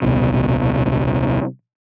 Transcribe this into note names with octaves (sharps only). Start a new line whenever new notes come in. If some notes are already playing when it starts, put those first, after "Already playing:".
D#1 C2 B2